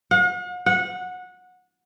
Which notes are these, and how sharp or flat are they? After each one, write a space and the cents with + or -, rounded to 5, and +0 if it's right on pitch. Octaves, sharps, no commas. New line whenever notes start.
F#5 -45
F#5 -20